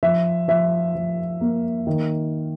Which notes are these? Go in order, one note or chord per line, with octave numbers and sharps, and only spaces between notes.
F3 E5
F3 E5
F3
A#3
D#3